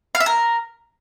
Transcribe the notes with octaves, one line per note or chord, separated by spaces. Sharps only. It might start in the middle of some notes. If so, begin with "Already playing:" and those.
F5
E5
A#4